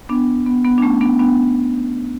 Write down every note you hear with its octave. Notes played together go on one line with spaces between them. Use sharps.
B3 D4
B3
B3
D4
A3 C#4
B3 D4
B3 D4